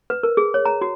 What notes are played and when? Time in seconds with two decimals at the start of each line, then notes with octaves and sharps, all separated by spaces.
0.10 B4
0.23 A#4
0.37 G#4
0.54 C#5
0.65 A#5
0.81 F#4